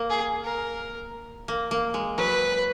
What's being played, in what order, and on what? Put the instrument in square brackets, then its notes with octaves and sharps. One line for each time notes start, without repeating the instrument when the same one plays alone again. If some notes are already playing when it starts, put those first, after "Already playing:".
Already playing: [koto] A#3
[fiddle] G#4
A#4
[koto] A#3
A#3
G#3
[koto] F#3 [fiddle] B4